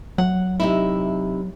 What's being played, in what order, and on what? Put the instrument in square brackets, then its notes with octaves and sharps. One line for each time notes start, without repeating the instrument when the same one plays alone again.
[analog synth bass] F#3 [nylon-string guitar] F#5
[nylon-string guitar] C3 D#4 E4